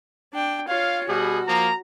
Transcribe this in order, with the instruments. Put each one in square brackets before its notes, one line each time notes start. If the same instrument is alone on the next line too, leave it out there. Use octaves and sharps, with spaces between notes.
[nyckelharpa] D4 G5
[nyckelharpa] F4 C#5 [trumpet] F5
[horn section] B2 G3 F#5 [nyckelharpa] F#4 [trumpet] G#4
[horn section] F3 [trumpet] A#3 [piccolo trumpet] A#5